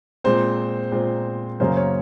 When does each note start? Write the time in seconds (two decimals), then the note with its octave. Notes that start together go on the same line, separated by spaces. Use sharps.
0.24 A#2 G#3 C4 C5
0.92 A#2 G#3 C4
1.60 F#2 C#3 F#3 A#3 C5
1.77 C#5